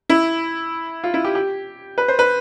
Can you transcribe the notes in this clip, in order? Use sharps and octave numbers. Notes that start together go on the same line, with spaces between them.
E4
F4
E4
G4
G4
B4
C5
B4